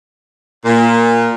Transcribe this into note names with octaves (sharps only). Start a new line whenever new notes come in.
A#2